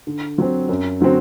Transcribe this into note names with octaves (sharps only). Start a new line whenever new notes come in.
D3
F#3 C4
F#2
D3 F#3 C4 F#4